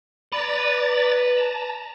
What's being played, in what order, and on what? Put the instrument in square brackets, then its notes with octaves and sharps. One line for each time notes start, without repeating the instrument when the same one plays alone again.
[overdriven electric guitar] B4 [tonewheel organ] D5 A#5 A6
[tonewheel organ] A5 A#5